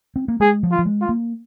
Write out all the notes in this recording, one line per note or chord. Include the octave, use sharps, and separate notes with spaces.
C4
A#3
G#3 G#4
F3
F4
F3
G#3
F4
A#3